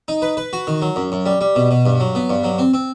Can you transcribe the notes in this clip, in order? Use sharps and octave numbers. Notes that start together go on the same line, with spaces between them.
D#4
B4
B4
F#4
D#3
F#3
F#2
F#2
G3
G3
B2
B2
G2
F#3
B3
G2
F#3
C4
C4